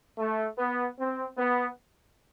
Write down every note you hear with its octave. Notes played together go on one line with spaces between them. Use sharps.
A3
B3
C4
B3